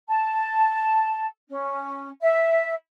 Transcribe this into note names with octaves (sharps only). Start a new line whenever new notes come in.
A5
C#4
E5